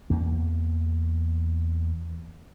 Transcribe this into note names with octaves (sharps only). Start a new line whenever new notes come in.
E2 A#3